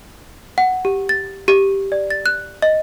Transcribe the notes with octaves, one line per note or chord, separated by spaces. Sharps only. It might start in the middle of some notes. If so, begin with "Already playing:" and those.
F#5
G4
A6
G4
D5
A6
F#6
D#5